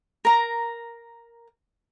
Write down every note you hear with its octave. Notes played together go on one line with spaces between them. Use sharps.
A#4 A#5